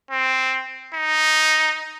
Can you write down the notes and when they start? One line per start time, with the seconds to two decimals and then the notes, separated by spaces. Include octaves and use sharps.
0.11 C4
0.95 D#4